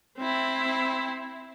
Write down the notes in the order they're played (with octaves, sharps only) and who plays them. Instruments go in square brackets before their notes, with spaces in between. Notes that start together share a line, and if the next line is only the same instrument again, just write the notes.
[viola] C4 E4